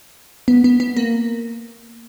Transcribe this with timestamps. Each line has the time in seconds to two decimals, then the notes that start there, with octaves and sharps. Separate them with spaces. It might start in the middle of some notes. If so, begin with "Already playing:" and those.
0.48 B3
0.64 B3
0.80 B3
0.97 A#3